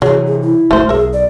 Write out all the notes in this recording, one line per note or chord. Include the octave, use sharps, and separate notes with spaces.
C3 E3 F#3 G#4
G#4
E4
D1 G#1 G#3 A3 C5
B1 G#4 A#4 E5
D5